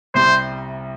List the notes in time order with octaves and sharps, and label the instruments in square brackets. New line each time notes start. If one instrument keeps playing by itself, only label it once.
[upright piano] C2 C3 G3 [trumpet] C5